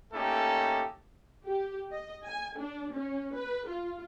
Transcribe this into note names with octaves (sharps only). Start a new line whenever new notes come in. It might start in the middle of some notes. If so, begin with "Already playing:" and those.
A3 A#3 C#4 D#4 G4 A4
G4
D#5
G#5
D4
C#4
B4
F4